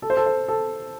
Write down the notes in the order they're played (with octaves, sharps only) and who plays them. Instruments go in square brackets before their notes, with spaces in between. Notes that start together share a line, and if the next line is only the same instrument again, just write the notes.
[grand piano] A4
C5
A4
C5
A4